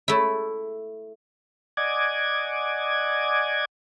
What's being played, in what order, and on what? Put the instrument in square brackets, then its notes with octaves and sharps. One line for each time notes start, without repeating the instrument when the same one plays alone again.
[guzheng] A3 E4
[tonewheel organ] D5 D#5 F#5 G#5 D6 G#6